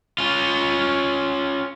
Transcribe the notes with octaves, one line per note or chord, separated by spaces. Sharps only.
C#4 F4